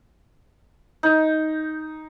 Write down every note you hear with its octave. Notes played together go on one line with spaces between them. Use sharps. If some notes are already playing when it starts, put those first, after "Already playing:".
D#4